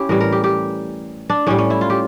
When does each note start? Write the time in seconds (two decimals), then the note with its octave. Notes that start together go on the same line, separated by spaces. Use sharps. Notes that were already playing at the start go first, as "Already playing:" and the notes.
Already playing: C#4 E4 G4
0.09 A2 E3 G3 A#4
0.20 A#4
0.32 G4
0.44 G4
1.30 D4
1.47 A2 G3 C#4
1.58 C#4
1.70 E4
1.81 F4
1.90 G4